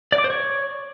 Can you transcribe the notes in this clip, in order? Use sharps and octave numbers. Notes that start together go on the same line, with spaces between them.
D5
D6
C5
C#5